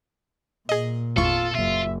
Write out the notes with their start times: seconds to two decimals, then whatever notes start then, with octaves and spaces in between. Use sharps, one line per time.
0.69 A#2 G#4 D#5
1.16 G#1 E2 F4 A4 C#6
1.55 F#1 F4 E5